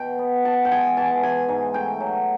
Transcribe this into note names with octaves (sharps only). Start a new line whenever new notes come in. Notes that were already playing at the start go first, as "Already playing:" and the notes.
Already playing: B2 G5
B3
B3 A5
G5
G#3 G#5
E3 A5
E3 G#5
G#2
A3 G5
F#3